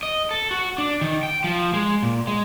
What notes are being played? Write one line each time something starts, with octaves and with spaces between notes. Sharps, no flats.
D#5
A4
F#4
D4
D#3
G5
F3
G#3
A#2
G#3